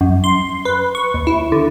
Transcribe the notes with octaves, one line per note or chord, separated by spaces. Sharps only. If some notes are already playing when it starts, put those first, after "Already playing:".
F#2
C6
B4
C#6
D#2
E4
D3